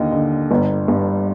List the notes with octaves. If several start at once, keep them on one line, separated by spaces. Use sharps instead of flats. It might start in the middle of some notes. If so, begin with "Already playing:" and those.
Already playing: D#2 D3 D#5
D3
G1
G2